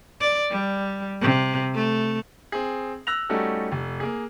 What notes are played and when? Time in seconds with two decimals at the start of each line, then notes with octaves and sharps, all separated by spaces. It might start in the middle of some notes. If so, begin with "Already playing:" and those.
0.20 D5
0.51 G3
1.21 C3
1.74 A3
2.52 C4 G#4
3.07 E6 F#6 A#6 F7
3.29 G3 A3 C#4 D#4 F#4 A4
3.72 F1
4.00 A#3 G#4